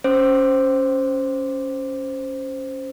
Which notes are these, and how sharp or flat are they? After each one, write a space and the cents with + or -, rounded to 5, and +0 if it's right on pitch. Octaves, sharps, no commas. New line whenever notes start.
C#4 +0 C5 +0 D6 +0